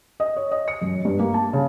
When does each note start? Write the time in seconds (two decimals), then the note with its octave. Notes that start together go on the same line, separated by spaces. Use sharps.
0.20 D#5
0.37 C#5
0.52 D#5
0.68 C#7
0.82 F#2
1.05 G2
1.19 A#3
1.34 A5
1.53 C#3